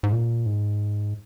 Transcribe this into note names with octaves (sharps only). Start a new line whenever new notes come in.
G#2
A#2
G#2